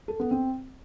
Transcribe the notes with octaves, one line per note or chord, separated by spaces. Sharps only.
A4
B3
C4